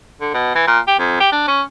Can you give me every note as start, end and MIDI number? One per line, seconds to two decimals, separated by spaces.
0.21 0.31 50
0.34 0.52 47
0.55 0.66 52
0.67 0.79 46
0.87 0.95 67
0.99 1.18 41
1.20 1.30 67
1.32 1.43 62
1.48 1.62 61